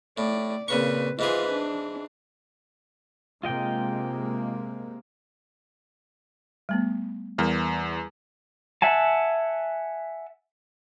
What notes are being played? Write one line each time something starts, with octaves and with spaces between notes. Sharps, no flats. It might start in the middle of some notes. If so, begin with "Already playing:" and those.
A2 D5
A#2 C#3 C4 B4 C#6
G#2 E3 F4 G#4 B4
D4
C3 G#3 A#3 F4 D#5 G5
G3 A3 B3
E2 G3 A#4
E5 F#5 G#5 A5